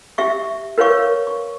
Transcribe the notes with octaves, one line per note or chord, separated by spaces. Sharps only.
G4 E5 C#6
A#4 B4 C#5 F5 C#6
C#6